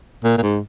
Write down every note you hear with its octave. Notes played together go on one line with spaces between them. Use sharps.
A#2
A#2
G#2